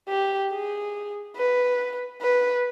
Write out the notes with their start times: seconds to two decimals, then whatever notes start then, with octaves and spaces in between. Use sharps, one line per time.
0.09 G4
0.51 G#4
1.37 B4
2.22 B4